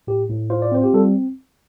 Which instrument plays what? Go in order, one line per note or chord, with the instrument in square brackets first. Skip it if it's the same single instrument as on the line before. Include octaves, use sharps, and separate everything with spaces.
[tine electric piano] A2 G4
A2
F4 C5
D5
C4 C5
G4
G3 A4